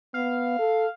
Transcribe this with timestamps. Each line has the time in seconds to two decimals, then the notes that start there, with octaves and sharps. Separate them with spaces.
0.14 B3 F5
0.59 A4